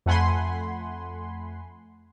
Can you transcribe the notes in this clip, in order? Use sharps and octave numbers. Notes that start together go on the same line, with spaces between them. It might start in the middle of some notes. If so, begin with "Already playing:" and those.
F2 A3 F#5 G#5 B5 C6